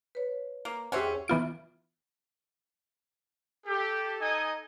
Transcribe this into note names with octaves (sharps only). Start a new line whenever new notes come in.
B4 C#5
A#3
E2 C4 C#4 G4 G#4 E5 F#5
E3 B3 F4 D7
G4 A4
D#4 D#5 G#5